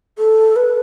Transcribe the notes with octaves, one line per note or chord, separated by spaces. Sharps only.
A4
B4